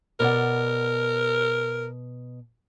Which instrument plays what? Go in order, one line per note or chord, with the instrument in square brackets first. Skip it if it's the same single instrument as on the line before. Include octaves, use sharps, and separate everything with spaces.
[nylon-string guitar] B2 D5 F#5 [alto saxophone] A#4